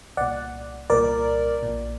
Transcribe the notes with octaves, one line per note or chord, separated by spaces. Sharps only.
C2 A#2 D5 F#5
C2 A#2 A#4 D5
A#1 A#2